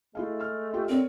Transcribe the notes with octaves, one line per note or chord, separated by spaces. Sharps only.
G#3 A3 E4 G#4 F5
F6
F4 G4 A4
D3 C4 A#4 C#5